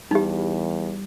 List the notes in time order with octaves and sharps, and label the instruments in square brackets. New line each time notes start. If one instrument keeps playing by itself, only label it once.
[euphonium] E2 [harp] G3 [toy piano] D#4 G4